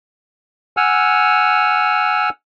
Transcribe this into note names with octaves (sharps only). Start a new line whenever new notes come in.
F#5 G#5 E6 F6